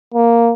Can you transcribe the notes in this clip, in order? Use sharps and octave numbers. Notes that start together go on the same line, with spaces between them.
A#3